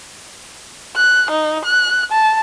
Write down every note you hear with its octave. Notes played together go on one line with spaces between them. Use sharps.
F#6
D#4
F#6
A5